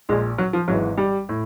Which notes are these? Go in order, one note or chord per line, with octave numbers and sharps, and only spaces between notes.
A#1 A#2 G#3
F#3
F3
G#1 G#2 E3 F#3
G3
A2